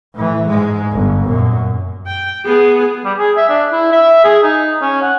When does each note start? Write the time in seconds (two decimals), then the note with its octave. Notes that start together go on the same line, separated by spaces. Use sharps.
0.14 A2 E3
0.48 G#2 G#3
0.92 G1
1.25 F#2 A#2
2.06 G5
2.45 B3 G#4
3.05 G3
3.18 G#4
3.37 E5
3.49 D4
3.72 E4
3.92 E5
4.24 G#4
4.43 D#4
4.82 C#4
5.02 F#5